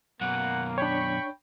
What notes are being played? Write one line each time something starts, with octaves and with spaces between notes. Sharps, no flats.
F#2 B2 A#3 F#5
D4 C#5 G5 B5 C#6